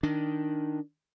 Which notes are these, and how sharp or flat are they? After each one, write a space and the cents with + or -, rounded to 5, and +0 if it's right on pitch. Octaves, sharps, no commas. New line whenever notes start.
D#3 +0 D4 +0